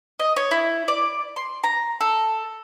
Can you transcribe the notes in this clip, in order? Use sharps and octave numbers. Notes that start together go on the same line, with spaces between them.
D#5
C#5
E4
D5
C6
A#5
A4